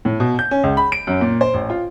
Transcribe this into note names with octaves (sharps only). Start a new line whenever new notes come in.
A2
B2
G6
C#4
C#2
B5
D7
F#2
A#2
C5
A1
F4